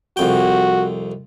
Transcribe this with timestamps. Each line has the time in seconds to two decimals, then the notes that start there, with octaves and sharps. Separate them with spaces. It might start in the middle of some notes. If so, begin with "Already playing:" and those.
0.17 C2 F2 F#4 G5